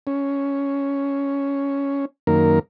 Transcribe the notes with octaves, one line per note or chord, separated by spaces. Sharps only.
C#4
F#2 D#3 A#3 A#4